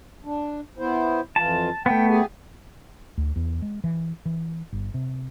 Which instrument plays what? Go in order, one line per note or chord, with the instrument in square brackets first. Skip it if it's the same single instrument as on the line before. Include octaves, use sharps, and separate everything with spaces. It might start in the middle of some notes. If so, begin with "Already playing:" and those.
[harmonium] D4
B3 E4 C5
[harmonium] F2 E3 F4 [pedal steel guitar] A5
[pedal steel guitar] A3 B3 [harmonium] G5
[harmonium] G4 G#4 G#5
[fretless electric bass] D2
E2
G#3
E3
E3
G1
C3